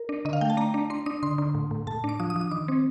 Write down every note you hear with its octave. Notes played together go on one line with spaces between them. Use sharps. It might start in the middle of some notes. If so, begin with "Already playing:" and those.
Already playing: A#4
D4
D3 D#5
F5
A3 G5
A5
D4 A#5
D4
D4 C6
D4 D#6
D3 C6
D3
A2
A2
A2 A5
D4
D6
F3 D#6
D#6
F3
D#6
D#3 D6
C4